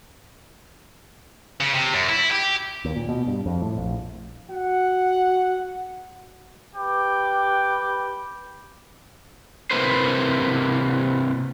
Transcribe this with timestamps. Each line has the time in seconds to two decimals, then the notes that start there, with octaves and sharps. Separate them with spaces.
1.61 C#3
1.74 C3
1.94 F#2
2.09 E4
2.31 G4
2.85 D#2
2.96 A#2
3.09 B2
3.27 G2
3.46 F2
3.62 A2
3.78 A#1
4.51 F#4 F#5
6.74 G4 B4 G5 D6
9.71 C3 A#3 E4 B4 C5